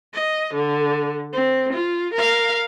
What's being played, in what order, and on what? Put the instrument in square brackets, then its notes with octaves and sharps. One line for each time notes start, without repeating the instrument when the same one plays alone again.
[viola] D#5
D3
C4
F4
A#4 F5